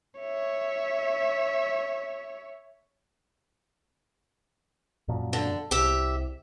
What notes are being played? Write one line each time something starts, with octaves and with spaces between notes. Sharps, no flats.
C#5 E5
F#2 A#2 F3
D3
C2 G4 E5